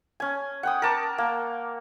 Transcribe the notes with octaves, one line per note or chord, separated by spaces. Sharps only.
C#4 G#5
F#5 G5 D#6
A#4 A5 D6
A#3